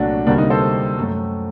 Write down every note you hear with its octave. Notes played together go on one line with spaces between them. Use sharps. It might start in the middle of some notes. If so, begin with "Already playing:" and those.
Already playing: C2 A#2 F#3 A3 D4 F#4
D2 C3 G3 A#3 D4 F#4
D#4
A4 C5
F#2 F#3 A3